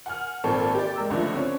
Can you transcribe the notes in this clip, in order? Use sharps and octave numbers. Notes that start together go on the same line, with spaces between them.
F#5 G#5 F6
G#1 A#2 C4 A4 C#6
G4 D5
G#3 A#4 E6
C#2 D3 F3 A3
D3 C4 C#4